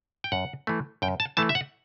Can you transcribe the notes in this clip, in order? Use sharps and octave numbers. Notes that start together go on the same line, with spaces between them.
G5
F#2 F#5
E3 A3
F#2 G5
A5
E3 A3 A5
E5
F#5